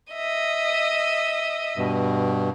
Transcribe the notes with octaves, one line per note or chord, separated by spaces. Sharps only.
D#5 E5
G2 B2